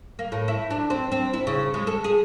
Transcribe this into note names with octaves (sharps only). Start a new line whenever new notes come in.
A#3
A2
E4
D4
C4
C4
E4
C#3
G#3
A4
G#4